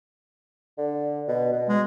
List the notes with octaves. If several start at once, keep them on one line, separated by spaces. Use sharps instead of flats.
D3
B2
B2
G#3